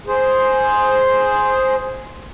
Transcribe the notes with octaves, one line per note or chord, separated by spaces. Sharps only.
G#4 C5